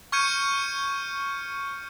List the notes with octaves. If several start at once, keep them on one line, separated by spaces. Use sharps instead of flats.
C#6 F6 G6 G#6 C#7 D#7